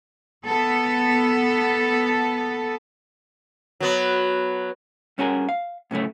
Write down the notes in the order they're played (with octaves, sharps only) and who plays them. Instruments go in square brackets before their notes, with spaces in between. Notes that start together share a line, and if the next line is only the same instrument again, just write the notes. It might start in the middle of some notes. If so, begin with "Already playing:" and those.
[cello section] B3 A4
[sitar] F#3 B3
[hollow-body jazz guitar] G2 C#4 F#4 G#4 A#4
F5
A2 C#3 F#3 A3